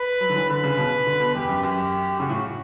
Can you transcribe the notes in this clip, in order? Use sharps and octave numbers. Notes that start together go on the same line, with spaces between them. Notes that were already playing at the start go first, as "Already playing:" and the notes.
Already playing: B4
F#3
D3
E3
D3 B4
C#3
B2
D3
B2
E2 G4
F#2
F#2 G4
C#3 F#4
A2